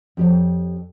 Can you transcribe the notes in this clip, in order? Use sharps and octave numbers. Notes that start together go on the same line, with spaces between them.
F2 G4 C#5